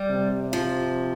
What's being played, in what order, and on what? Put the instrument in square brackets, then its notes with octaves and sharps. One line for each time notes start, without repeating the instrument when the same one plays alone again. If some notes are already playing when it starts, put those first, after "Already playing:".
Already playing: [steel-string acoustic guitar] G3
[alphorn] C3
[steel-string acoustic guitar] F3